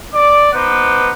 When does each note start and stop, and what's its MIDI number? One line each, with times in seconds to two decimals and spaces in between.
0.14 0.49 74
0.14 0.49 86
0.53 1.12 59
0.53 1.12 63
0.53 1.12 71
0.53 1.12 72
0.53 1.12 78
0.53 1.12 86